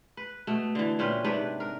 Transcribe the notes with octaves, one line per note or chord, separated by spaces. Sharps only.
B4
B2 A3
D3 E3
A#2 C4 C#4 B4
G#2 C3 D4 B4
A#4